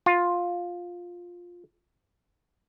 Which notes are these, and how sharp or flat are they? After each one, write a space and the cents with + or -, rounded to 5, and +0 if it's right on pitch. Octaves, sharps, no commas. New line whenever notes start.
F4 +10